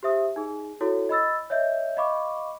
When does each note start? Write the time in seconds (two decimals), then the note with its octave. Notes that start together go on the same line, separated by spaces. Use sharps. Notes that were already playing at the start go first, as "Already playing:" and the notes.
0.03 G4 C5 E5 D#6
0.36 D#4 G#4
0.81 E4 F#4 A4 C#5
1.09 D#5 B5 E6 A6
1.50 C#5 D#5 E5 G6
1.97 D#5 F5 B5 C#6 D6